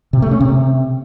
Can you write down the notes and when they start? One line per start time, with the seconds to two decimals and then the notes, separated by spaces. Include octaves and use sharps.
0.13 C3
0.22 A3
0.31 C#4
0.41 C3